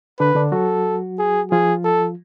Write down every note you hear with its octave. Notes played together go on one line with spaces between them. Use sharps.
D3 D4 B4
D3 D4
F#3 F#4 A4
G#4
F3 F4 G#4
A4